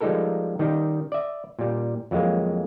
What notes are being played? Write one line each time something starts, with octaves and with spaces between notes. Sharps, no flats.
F3 G3 G#3 D#4 A4 A#4
D#3 G3 D#4
D5 E5
A#2 G3
F2 F#3 G#3 A#3